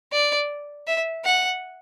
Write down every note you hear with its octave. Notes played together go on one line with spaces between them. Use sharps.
D5
E5
F#5